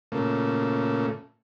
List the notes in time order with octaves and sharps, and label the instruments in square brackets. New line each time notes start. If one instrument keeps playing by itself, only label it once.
[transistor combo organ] A#2 C#3 A3